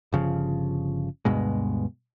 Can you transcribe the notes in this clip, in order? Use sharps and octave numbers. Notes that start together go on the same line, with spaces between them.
G1 C#3 F3
D2 G2 B2 G#3